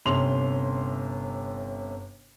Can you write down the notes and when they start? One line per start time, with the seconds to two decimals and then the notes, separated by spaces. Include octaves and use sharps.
0.05 G1 C3 C#4 C6 F7